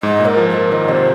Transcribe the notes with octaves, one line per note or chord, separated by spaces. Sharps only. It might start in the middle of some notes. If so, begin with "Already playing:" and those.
G#2 D#5
A#2
A#4
F3
F3 A#4
D#3 D#5
C3 C5